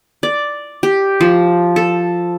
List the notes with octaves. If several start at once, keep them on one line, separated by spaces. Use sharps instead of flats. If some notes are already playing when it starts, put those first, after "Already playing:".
D5
G4
F3
A4